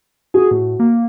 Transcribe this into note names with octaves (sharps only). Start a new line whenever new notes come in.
F#4 G#4
A2
A#3